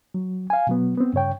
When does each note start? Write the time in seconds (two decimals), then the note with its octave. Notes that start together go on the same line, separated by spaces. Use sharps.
0.14 F#3
0.50 F5 G#5
0.67 B2 F#3 B3
0.97 B3 C4
1.13 G2 C#3 C#5 G5